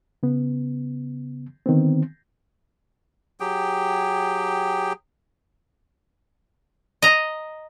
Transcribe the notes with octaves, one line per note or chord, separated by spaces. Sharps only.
C#3 B3
D3 D#3 B3 C4
F#3 G4 G#4 G5
D#5 A#5